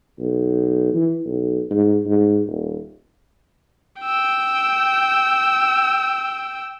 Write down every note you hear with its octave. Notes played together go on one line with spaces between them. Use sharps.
B1
E3
B1
G#2
G#2
D#1
G5 E6